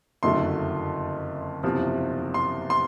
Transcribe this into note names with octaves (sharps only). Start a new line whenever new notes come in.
F#1 F2 D3 F#3 A3 C6
F#1 E2 C3 F3
C6
C6